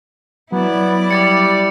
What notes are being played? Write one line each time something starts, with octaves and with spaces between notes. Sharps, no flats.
F#3 B3 E4 D5
G3 D6 A6 C#7